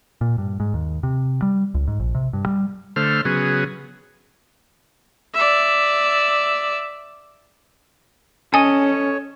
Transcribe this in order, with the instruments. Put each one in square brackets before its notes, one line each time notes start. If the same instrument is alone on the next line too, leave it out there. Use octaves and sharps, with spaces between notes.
[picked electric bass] A#2
G2
G#2
D#2
C3
G3
C#2
G#2
A#1
C3
G2
G3
[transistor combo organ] D3 A3 C5 F6
C#3 F#3 B3 G#4
[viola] D5 E5
[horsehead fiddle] C#4 [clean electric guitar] A4 D#5 [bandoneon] C#5 [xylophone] G#5